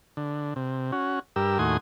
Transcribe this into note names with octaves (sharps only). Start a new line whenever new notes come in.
D3
C3
C#4 F#4
G2 G4 A#4 E6
D#2 A2 F#4 G#5 C6 D#6